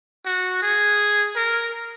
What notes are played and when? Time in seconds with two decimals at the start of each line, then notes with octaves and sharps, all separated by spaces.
0.26 F#4
0.63 G#4
1.36 A#4